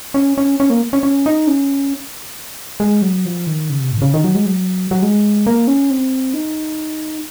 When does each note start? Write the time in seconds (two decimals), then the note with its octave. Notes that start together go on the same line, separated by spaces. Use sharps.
0.14 C#4
0.38 C#4
0.60 C#4
0.70 A#3
0.93 C#4
1.03 C#4
1.26 D#4
1.47 C#4
2.80 G#3
3.02 F#3
3.25 F3
3.47 D#3
3.70 C#3
3.80 C3
3.92 G#2
3.97 D#3
4.02 C#3
4.14 D#3
4.24 F#3
4.35 G#3
4.46 F#3
4.91 F#3
5.02 G#3
5.47 A#3
5.67 C#4
5.90 C4
6.34 D#4